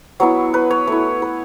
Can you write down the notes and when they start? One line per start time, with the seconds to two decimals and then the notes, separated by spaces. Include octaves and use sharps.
0.20 F#3 B3 E4 C#5
0.54 B4
0.71 C#5
0.87 A3 E4 C#5
1.22 B4